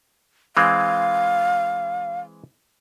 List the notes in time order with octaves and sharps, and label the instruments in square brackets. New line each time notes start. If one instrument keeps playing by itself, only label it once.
[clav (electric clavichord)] E3 G#3 C4 [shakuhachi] F5